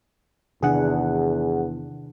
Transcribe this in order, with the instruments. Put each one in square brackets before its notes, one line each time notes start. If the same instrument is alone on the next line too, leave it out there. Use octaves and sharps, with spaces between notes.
[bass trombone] E2 [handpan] C3 D#3 D4 [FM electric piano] G#4 F#5